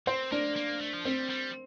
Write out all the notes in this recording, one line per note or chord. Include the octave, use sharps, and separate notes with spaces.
C4 C5
A#3 D4
A#3
A3
F3
G3 C4
G3